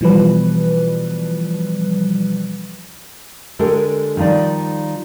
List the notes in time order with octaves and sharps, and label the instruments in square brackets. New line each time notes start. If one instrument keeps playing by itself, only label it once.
[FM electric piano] B2 E3 F3 G3 B4
[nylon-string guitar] D3 G#3 G4 A4 A#4
D#3 F3 G3 D#4 D5